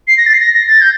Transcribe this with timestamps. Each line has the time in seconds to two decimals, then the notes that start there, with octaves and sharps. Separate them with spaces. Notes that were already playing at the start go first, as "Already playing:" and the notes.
0.08 C7
0.17 A#6
0.26 A6
0.34 C7
0.40 A#6
0.54 A#6
0.68 A6
0.81 G6